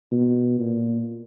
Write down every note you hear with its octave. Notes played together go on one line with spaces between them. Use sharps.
B2
A#2